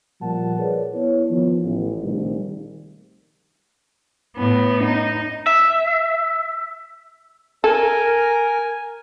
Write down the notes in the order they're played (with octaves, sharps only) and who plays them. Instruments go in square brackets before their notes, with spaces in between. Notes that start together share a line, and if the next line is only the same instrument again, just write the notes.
[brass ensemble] A#2 F3 G3 F#5 A5
G#4 A#4 B4 C#5 D5
B3 E4 C#5
D#3 F3 B3
A1
A#1 C3 D#3 G3 A3
[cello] A2 B3
D#4
[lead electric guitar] E5
[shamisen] A4 [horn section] A#4 [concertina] G#5